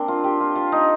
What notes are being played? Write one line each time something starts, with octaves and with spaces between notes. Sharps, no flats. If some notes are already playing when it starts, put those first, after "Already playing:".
Already playing: A#3 C4 D4
F4
G4
F4
F4
D#4